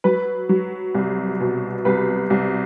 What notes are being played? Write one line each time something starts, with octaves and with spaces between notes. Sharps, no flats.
F#3 B4
F#3
C2
B2
C2 B4
C2